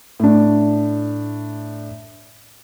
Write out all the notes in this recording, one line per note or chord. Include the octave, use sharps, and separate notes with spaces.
A2 D4